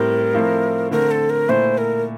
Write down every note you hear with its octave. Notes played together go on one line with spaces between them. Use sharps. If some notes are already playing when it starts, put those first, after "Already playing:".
Already playing: A2 G3 C4 A#4
F3 A3 C4 E4
D3 A3 C4 A#4
A4
A#4
A#2 A3 E4 C5
A#4